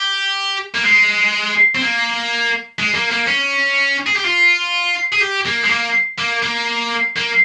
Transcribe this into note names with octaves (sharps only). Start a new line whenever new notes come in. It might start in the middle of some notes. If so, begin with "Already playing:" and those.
Already playing: G4
A#3
G#3
C4
A#3
G#3
A#3
A#3
C#4
G#4
G4
F4
G#4
G4
A#3
G#3
A#3
A#3
A#3
A#3